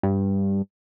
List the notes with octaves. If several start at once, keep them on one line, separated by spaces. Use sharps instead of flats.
G2